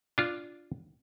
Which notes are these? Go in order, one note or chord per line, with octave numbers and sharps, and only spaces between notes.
D4 F4